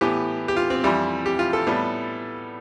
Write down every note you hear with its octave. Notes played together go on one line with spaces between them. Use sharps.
A2 E3 B3 G4
G4
F4
C4
F2 E3 G3 E4
G4
F4
A4
A2 G3 B3